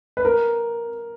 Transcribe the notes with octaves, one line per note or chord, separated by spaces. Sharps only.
B4
A#4